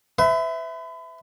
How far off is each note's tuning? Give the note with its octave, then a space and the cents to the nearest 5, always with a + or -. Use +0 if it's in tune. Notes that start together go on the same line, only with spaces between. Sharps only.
B4 +35 E5 -5